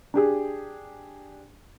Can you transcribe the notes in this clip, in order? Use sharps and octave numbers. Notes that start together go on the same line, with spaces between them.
D4 G4 G#4